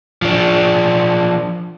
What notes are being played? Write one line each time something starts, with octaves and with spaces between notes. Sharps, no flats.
F3 D4